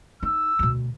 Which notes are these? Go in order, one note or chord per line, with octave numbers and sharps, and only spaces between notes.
D#4 E6
D2 B2